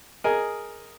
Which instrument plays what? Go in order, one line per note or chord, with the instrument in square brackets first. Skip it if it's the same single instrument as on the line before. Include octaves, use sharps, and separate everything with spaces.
[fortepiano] G#4 A#4 D#5 G#5